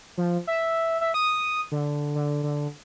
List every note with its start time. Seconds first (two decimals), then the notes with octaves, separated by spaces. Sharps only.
0.18 F3
0.47 E5
1.01 E5
1.14 D#6
1.72 D3
2.15 D3
2.43 D3